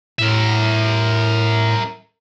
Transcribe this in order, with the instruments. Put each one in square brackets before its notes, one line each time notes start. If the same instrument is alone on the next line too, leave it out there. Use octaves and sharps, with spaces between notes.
[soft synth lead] A2 [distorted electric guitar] A#4 E5